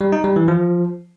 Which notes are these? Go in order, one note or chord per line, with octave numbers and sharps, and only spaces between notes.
G3
D#4
G3
E3
F3